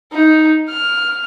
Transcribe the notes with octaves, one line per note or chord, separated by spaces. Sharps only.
D#4
F6